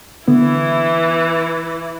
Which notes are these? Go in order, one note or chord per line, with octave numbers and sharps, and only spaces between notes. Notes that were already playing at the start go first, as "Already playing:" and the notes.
D3 E3 B3 E4